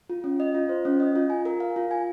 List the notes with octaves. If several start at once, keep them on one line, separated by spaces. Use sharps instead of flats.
F4
C#4
D#5
F4
C5
C#4
D#5
F4
G#5
A#4
F5
F4
G#5